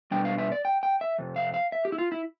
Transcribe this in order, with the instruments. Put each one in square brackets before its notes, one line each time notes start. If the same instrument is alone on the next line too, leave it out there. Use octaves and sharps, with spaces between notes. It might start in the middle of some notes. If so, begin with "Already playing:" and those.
[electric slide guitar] B2 G3 D4 G5
F5
E5
D5
G5
G5
E5
F2 C3
F5
F5
E5
G4
E4
F4
E4